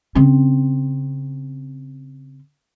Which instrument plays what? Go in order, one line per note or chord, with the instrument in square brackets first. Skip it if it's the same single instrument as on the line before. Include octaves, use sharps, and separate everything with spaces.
[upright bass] C#3 C4